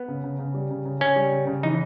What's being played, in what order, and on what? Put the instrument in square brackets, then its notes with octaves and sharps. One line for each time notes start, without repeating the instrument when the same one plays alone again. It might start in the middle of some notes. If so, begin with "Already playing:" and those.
Already playing: [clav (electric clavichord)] B3
[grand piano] C#3
C#3
C#3
G3
C#3
C#3
[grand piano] C#3 [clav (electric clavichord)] C#4
[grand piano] G3
C#3
C#3
[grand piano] E3 [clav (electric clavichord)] D#4